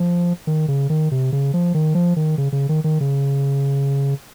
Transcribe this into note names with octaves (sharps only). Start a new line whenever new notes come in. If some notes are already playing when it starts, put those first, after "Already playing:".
Already playing: F3
D#3
C#3
D#3
C3
C#3
F3
D#3
F3
D#3
C#3
C#3
D#3
D#3
C#3